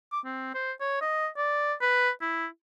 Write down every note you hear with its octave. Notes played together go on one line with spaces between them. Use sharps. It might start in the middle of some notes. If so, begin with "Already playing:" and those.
D6
C4
C5
C#5
D#5
D5
B4
E4